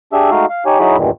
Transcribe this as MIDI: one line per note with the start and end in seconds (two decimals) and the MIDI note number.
0.13 0.31 62
0.13 0.31 67
0.13 0.31 68
0.13 0.31 76
0.13 0.31 88
0.31 0.46 56
0.31 0.46 57
0.31 0.46 63
0.31 0.46 66
0.31 0.46 77
0.50 0.64 77
0.66 0.79 63
0.66 0.79 67
0.66 0.79 73
0.66 0.79 80
0.79 0.97 54
0.79 0.97 63
0.79 0.97 64
0.79 0.97 66
0.79 0.97 68
0.79 0.97 83
0.97 1.11 40
0.97 1.11 43
0.97 1.11 46
0.97 1.11 51
0.97 1.11 52